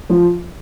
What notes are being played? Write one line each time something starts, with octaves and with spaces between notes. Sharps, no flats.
F3